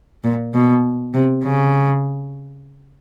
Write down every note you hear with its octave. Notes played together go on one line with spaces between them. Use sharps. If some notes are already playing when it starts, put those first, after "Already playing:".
A#2
B2
C3
C#3